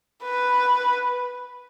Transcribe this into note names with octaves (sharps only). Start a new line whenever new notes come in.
B4